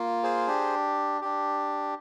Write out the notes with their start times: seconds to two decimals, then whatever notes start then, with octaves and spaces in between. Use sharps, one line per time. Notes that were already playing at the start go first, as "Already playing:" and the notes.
Already playing: A#3 F4
0.23 G#4 C5
0.47 D4 G4
1.21 D4 G4